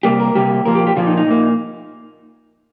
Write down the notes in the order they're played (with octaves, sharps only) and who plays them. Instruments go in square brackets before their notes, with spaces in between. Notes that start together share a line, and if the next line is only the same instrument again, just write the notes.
[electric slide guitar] C3 G3 A#3 G4
A#4
C3 G3 A#3 G4
A#2 F3 A#3 A#4
G4
G4
A#2 F3 A#3 F4
D#4
D#4
A#2 A#3